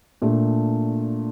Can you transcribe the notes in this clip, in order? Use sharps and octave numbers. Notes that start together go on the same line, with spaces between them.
A#2 A3 D4